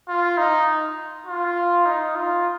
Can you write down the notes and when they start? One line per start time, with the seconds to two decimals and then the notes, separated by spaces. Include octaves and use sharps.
0.08 F4
0.38 D#4
1.27 F4
1.86 D#4
2.16 F4